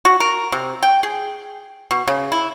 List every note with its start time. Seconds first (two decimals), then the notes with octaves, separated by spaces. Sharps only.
0.05 F#4
0.20 A#4
0.52 C3
0.83 G5
1.03 G#4
1.91 B2
2.08 C#3
2.32 E4